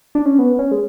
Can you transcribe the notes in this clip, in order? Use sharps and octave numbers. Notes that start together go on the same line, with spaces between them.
D4
C#4
B3
C#4
G#3